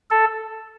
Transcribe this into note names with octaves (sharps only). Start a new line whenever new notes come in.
A4